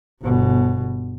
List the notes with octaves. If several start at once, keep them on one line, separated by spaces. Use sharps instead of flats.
G1 B2